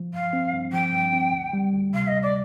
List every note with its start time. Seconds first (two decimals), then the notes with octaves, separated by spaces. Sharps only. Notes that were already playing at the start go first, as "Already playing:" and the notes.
Already playing: F3
0.13 G2 F5
0.33 C4
0.53 G2
0.72 F3 G5
0.93 G2
1.13 C4
1.33 D2
1.53 G3
1.72 D2
1.93 C3 F5
2.07 D#5
2.12 D2
2.22 D5